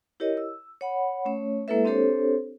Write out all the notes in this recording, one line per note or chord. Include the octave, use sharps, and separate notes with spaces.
E4 G4 A#4 C#5 D#5
E6
C#5 F#5 B5
A3 C#4 C#5
G#3 A#3 E4 A4 B4 E5
C4 D4 G4 A4 C5 C#5